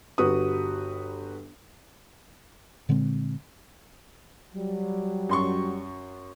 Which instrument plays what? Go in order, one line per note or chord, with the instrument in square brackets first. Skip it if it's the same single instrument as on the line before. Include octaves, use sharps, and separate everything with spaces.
[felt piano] G1 F#4 G4 B4 D#6
[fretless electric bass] A#2 D3 G#3 C4
[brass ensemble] F#3 G3
[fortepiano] F#2 C6 C#6